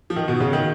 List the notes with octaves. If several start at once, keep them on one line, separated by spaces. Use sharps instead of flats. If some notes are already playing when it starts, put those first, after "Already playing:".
F3
D#3
B2
C#3
D#3